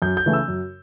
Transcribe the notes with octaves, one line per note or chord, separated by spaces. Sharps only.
F#2 G6
G6
C#3 E3 A3
E6
F#2